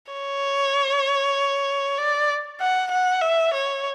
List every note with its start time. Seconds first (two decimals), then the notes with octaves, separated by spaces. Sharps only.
0.12 C#5
1.98 D5
2.60 F#5
2.91 F#5
3.22 E5
3.54 C#5